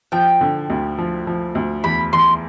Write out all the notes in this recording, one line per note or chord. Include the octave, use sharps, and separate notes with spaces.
F3 G5
D3
D2
F3
F3
D2
E2 B5
E2 C6